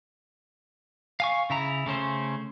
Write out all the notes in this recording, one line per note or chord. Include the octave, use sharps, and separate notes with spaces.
F5 G#5 C#6
C#3 E4 A#5
C#3 A3 C#4 C5